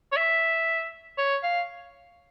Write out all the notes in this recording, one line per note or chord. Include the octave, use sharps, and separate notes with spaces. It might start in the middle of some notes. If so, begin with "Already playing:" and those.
C#5
E5
C#5
F5